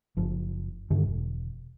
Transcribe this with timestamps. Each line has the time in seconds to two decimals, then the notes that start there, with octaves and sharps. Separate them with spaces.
0.17 F#1 F3
0.90 G2 D3 D#3
1.06 E1